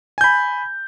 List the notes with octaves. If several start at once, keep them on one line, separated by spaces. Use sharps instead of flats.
G#5 B5 G6